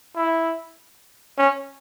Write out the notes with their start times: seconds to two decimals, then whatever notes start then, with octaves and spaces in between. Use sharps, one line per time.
0.16 E4
1.38 C#4